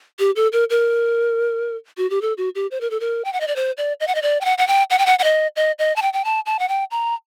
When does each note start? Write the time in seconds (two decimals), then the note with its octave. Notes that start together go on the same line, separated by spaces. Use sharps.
0.19 G4
0.36 A4
0.53 A#4
0.70 A#4
1.98 F#4
2.10 G4
2.22 A4
2.38 F#4
2.55 G4
2.71 C5
2.81 A#4
2.91 A4
3.00 A#4
3.25 G5
3.33 F#5
3.41 D#5
3.47 D5
3.56 C5
3.77 D5
4.00 D#5
4.07 F#5
4.15 D#5
4.22 D5
4.41 G5
4.45 F#5
4.58 F#5
4.68 G5
4.90 F#5
4.99 G5
5.06 F#5
5.19 F#5
5.24 D#5
5.56 D#5
5.79 D#5
5.96 A5
6.02 G5
6.13 G5
6.25 A5
6.46 A5
6.59 F#5
6.68 G5
6.91 A#5